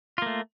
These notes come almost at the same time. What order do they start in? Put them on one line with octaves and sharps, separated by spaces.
F4 A#3 A3